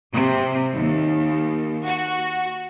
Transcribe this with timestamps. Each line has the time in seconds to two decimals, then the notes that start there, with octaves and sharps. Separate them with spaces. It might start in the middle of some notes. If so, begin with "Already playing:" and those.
0.11 C3
0.74 D#2
1.85 F#4